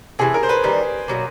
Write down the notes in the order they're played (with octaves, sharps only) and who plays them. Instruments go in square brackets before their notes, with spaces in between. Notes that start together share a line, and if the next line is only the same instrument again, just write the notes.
[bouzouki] C3 E3 A3 [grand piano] G#4
[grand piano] A#4
C5
B4
[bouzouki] D#3 G3 A#3
B2 F#3 A#3